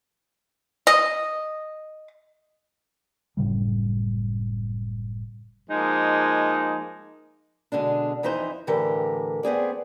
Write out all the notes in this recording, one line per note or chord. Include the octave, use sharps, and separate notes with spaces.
D#5
F#1 A2 C#3 G3
F3 G#3 A#3 D#4
B2 D3 G#3 D4
F2 E3 D#4 E4 C5
A2 D3 E3 G4 A#4
B3 C4 G#4 D5